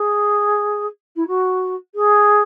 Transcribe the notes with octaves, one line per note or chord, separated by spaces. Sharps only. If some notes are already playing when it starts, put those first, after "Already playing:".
Already playing: G#4
E4
F#4
G#4